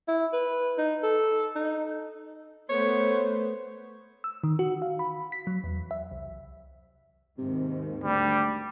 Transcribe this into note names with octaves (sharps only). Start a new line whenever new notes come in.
E4
B4
D#4
A4
D#4
A3 B3 C5 C#5
E6
D#3
F#4
F5
B5
B6
F#3
E2
E5
C2
D#2 G#2 C3 D#3
D2 G3